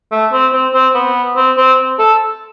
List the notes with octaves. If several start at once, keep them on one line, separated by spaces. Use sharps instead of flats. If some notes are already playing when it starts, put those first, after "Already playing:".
A3
C4
C4
C4
B3
C4
C4
A4